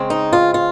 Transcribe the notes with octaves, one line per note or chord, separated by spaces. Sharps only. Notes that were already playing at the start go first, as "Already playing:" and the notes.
Already playing: C#3 G#3 C4
D#4
F4
F4